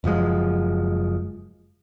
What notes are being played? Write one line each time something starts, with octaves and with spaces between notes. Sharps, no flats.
F#1 F#2 F3 G#3